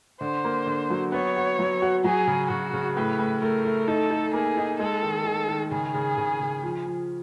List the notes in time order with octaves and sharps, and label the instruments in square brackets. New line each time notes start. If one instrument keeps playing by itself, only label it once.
[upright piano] D3 [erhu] C5
[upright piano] A#3
D3
F#3
[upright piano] B3 [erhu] C#5
[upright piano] F#4
F#3
F#4
[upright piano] F#3 [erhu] G#4
[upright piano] C#3
[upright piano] C#3 [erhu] F#4
[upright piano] C#3
[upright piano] A2 [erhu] B4
[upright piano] A2
[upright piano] A3 [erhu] A#4
[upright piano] A3
[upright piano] D#4 [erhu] A4
[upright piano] D#4
[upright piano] A#3 [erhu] G#4
[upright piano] D#4
[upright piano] G#3 [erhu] A4
[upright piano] D#3
D#3
D#3
[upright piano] C#3 [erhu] G#4
[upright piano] C#3
C#3
C#3
F3
F3